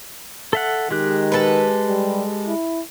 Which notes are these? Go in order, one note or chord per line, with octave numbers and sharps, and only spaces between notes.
A4 E5 F#5
D#3 G#3 G4 F#6
A4 B4
G3
E4